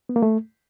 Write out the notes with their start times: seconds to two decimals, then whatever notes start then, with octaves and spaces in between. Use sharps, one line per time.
0.09 B3
0.16 A#3
0.22 A3